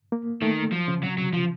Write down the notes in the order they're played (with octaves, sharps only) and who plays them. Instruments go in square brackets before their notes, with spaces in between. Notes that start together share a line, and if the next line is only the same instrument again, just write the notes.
[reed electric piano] A#3
[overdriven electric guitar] D#3 [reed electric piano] A3
[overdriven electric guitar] F3 [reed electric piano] F#3
[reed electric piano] C#3
[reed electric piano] C3 [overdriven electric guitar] F#3
[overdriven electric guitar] F#3
F3